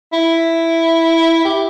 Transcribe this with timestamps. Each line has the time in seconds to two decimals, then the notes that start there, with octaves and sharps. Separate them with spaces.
0.13 E4
1.45 G4